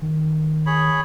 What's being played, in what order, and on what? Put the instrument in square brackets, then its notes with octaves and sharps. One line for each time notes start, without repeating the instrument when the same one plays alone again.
[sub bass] D#3
[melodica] G#4 C#5 B5